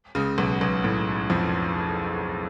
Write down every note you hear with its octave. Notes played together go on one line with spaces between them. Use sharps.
C#2 C#3
B1 B2
B1 B2
A2
F2 F3